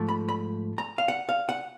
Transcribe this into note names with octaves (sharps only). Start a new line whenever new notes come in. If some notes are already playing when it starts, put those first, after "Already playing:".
Already playing: G#2 F3 A3
B5
B5
A#5
F5
F#5
F5
F#5